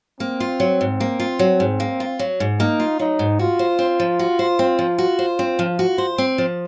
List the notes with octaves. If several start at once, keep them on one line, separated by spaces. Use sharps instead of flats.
A#3 C4
F4
F#3
G#2
A#3
F4
F#3
G#2
A#3
F4
F#3
G#2
A#3 D#4
F4
F#3 D#4
G#2
F4 F#4
C5
C4
F3
F#4
C5
C4
F3
F#4
C5
C4
F3
F#4
C5
C4
F3